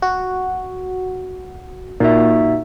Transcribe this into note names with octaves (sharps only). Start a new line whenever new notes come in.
F#4
A#2 D#4 F#4 E5